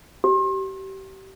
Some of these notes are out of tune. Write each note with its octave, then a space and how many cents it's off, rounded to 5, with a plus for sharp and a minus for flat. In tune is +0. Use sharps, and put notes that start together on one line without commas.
G4 -30